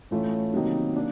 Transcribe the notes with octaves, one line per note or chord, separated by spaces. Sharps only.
A2 E3 A3 C#4 F4
C3 D#3 F#3 A#3 D#4
A#3 D4